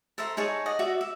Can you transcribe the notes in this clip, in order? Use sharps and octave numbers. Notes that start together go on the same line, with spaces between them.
A4 C5 E5 A#5
D#4 G#4 C#5 A5
D5 D#5 F#5
F#4 D5 E5
E5